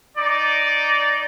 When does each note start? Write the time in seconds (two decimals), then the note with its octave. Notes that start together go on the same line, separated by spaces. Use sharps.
0.17 D#4 D5